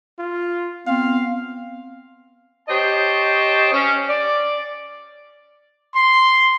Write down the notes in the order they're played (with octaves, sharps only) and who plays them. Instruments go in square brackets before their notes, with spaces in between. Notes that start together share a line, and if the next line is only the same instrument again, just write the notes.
[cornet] F4
[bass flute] B3 [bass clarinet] C4 [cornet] F5
[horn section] G4 C5 C#5 D#5 A5
C#4
D5
[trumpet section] C6